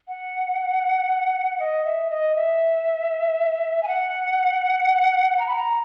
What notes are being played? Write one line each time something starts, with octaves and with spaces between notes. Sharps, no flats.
F#5
D#5
E5
D#5
E5
G#5
F#5
A#5
B5
A#5